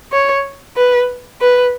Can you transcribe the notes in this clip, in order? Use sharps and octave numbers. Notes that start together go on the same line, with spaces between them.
C#5
B4
B4